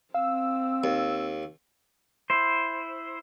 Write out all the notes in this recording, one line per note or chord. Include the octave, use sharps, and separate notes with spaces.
C4 F5 E6
D#2
E4 C5